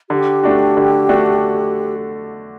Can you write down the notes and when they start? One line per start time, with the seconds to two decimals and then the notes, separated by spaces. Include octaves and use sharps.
0.10 D3 G4
0.43 A3 D4 F#4
0.77 D3
1.09 A3 D4 F#4